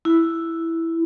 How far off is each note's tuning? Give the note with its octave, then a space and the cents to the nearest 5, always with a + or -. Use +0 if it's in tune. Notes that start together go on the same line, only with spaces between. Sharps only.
E4 +0